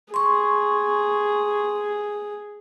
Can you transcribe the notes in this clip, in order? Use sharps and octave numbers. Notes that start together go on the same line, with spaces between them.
G#4 C6 C#6